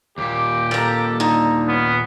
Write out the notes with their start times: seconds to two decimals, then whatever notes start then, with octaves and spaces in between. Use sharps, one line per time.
0.18 D#2 A#2 G4 D6
0.71 A#3 A4 A#5
1.20 D3 D#4 A#5
1.68 B3 C#4